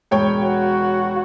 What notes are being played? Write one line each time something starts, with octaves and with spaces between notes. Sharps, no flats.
E1 C#5 G5
F#4